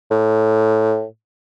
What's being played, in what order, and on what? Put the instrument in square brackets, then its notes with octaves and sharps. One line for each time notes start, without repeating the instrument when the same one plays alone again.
[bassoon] A2